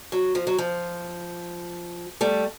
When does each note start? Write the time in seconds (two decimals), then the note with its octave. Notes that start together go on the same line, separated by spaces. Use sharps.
0.12 F#3
0.35 F3
0.47 F#3
0.59 F3
2.21 G3 A3